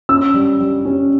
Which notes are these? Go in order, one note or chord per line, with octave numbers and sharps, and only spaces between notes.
C#4 E6
G3
G3
C#4